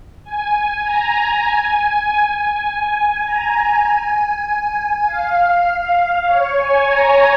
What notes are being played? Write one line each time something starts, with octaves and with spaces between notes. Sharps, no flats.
G#5
A#5
G#5
G#5
A#5
G#5
F5
C#5
G#5
A#5